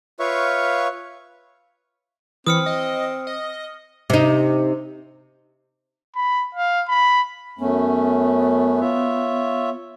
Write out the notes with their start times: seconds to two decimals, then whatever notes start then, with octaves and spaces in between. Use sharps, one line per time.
0.19 F4 B4 C#5 E5 F5 C#6
2.47 E3 C4 D#6 F6 C#7
2.66 D#5
3.27 D#5
4.10 C3 D#4
6.16 B5
6.55 F5
6.88 B5
7.59 F#2 A3 B3 C#4
8.80 F4 C#5 E5